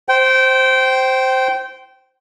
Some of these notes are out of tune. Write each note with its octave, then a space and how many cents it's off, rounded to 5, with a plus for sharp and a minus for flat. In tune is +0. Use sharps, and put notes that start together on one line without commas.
C5 +0 G5 -20